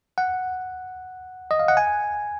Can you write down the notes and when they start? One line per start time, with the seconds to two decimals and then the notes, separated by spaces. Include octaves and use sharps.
0.18 F#5
1.51 D#5
1.59 F5
1.68 F#5
1.77 G#5